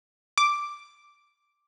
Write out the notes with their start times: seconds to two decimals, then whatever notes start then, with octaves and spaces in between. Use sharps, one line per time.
0.38 D6